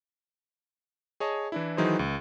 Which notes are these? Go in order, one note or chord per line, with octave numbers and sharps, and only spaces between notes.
G#4 C#5 D#5 A5
E3 D4 E4
D#3 E3 F#3 D#4 G#4 C5
C#2